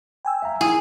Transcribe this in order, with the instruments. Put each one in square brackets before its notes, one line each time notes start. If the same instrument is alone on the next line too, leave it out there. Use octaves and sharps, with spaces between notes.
[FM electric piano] G5 G#5 E6
[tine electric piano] E5 F5 A#5
[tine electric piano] E4 [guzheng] G#4